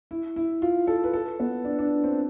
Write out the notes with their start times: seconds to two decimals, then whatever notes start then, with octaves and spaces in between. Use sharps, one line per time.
0.11 E4
0.36 E4
0.62 F4
0.87 A4
1.04 B4
1.13 A4
1.40 B3
1.65 D4
1.79 D4
2.04 C4